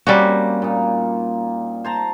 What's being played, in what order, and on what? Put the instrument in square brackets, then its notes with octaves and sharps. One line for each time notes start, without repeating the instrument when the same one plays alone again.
[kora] G3 C#4 F#4 [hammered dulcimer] A#3 C4
[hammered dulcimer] A#2 D#4
C5 A5 A#5